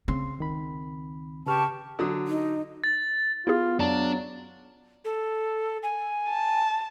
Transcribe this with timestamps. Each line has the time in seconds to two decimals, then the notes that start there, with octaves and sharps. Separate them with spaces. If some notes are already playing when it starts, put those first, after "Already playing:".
0.08 C#3 C4 C6
0.39 C#2 D#3 B5
1.46 C#3 G4 B4 A5 C#6 F6
1.99 D3 F#3 D#6
2.27 D#4
2.84 A6
3.47 B3 E4 F4 G4 G#4
3.80 F#2 F#3 D4 D5 A5
5.05 A4
5.83 G#5
6.30 A5